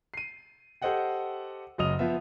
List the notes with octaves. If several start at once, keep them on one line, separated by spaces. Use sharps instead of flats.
C7 D#7
G4 A4 C5 D#5 F#5 G5
F#1 F#3 D#5 D#6 F7
F3 B3 E5